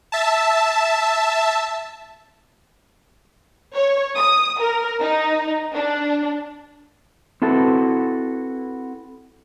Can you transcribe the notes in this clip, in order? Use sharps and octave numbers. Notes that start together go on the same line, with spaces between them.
E5 A5
C#5
D#6
A#4
D#4
D4
C4 E4 F#4 A4 B4